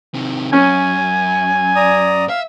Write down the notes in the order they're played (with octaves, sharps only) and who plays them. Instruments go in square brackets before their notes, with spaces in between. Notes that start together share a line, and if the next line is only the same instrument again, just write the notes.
[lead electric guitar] C3 D#3
[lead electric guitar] F#2 [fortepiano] C#4 [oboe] G#5
[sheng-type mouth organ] D5 A#5 D#6
[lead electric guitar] E5 [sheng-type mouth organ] F5